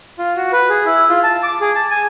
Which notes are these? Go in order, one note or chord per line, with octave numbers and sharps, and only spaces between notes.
F4
F#4
B4
G#4
E4
F4
A5
D6
G#4
A5
G#5